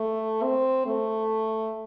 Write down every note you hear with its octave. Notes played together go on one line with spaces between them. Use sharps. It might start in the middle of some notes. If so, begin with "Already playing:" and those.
Already playing: A3
C4
A3